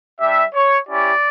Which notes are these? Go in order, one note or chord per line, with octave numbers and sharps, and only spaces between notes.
G3 D4 G4 E5
C#5
C#4 E4 G4 D5